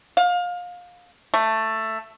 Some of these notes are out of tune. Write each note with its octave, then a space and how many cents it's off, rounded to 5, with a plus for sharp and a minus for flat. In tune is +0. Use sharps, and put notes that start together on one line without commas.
F5 +25
A3 +10